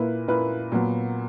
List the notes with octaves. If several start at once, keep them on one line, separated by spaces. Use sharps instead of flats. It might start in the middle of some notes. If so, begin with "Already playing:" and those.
Already playing: A#2 A#3 E4 B4
A#2 A#3 E4 B4
A#2 F#3 B3